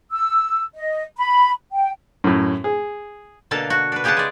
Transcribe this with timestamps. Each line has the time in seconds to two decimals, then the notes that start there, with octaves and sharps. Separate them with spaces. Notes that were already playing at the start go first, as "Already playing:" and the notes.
0.11 E6
0.74 D#5
1.18 B5
1.72 G5
2.24 F#2 A2
2.64 G#4
3.51 B2 D3 A#3 A4 F5 A5
3.70 F#4
3.92 D4 B4
4.04 C#3 G4 G#4 B4 F#5 A5
4.17 G#3 D5